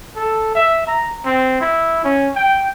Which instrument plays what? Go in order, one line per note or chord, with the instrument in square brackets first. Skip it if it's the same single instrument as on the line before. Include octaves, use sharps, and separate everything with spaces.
[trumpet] A4
E5
A#5
C4
E4
C#4
G5